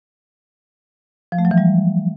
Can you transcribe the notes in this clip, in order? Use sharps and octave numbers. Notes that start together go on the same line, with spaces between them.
F3
A3
F#3
E3
G3